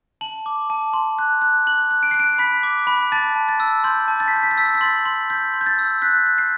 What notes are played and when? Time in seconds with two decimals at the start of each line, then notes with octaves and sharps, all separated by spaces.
0.21 A5 F#7
0.46 D6
0.70 A5
0.93 C6
1.19 F#6
1.42 F#6
1.67 F#6 F#7
1.91 F#6
2.03 D7
2.11 F#6 C7
2.20 D7
2.38 B5 B6
2.63 D6
2.87 B5
3.12 A5 A6
3.35 A5
3.49 A6
3.60 E6
3.84 C6 G6
4.08 A5
4.20 A6
4.28 B6
4.33 G6 A6
4.43 B6
4.51 A6
4.58 E6 B6
4.66 A6
4.75 B6
4.81 C6 A6
5.05 C6
5.30 G6 B6
5.54 C6
5.61 G6
5.66 A6
5.79 E6
6.02 F#6 B6
6.27 F#6
6.38 C7